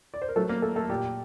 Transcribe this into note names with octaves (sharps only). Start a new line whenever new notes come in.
D5
C5
A#4
F#3 A3 A4
A#3 A#4
A3 A4
A3 A4
A#2 G4